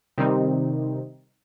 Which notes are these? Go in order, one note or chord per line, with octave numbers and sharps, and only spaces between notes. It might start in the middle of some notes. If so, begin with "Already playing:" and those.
C3 D#3 G3 C4 D#4